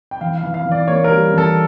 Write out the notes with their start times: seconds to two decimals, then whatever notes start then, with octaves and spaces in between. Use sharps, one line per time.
0.11 G5
0.21 E3 F5
0.38 F5
0.43 E3
0.54 F5
0.66 E3
0.71 D5
0.88 A#3 C#5
1.04 A#4
1.10 G3
1.32 E3
1.38 A4